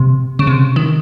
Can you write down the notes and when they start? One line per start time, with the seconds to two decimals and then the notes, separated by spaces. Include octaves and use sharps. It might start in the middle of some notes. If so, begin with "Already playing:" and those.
Already playing: C3
0.39 C#3
0.47 C3
0.76 D#3